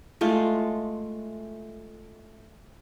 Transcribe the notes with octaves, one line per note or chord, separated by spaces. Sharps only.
G#3 A3 F4